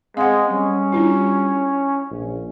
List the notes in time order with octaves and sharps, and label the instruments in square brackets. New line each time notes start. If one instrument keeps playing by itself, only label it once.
[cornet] G#3 [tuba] C4 [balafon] F5 F#5
[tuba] G3 [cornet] C#4
[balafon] D4 E4 F4
[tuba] A#1